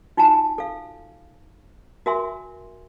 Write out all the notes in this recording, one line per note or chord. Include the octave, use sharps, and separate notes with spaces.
D#4 F4 F#4 G#5 A5
A4 F5
F#4 A#4 E5 G#5 C6